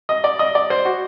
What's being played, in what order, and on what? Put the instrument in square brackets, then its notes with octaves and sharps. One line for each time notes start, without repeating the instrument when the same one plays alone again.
[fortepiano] D#5
D5
D#5
D5
C5
F#4